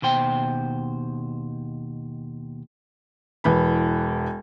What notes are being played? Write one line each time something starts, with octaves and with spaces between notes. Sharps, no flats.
D#2 B2 C5 G5
E1 E3 B5